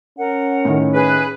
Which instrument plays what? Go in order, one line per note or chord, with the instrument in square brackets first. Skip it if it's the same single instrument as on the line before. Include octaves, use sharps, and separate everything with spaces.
[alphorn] C#4 [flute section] A#4 F#5
[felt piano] A2 D#3
[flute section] G#4 [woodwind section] B4